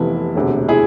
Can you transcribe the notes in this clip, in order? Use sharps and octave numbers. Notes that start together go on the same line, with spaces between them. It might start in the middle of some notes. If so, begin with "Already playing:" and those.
Already playing: F1 F2 C3 E3 B3 E4
E1 D2 C3
E4 G#4